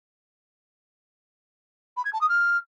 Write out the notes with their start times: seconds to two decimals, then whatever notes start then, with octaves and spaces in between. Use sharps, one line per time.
1.97 B5
2.05 G#6
2.13 A5
2.21 D#6
2.29 F6